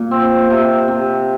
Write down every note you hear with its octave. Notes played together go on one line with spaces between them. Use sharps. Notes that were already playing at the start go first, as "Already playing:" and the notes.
Already playing: A#2
C4
C3
C3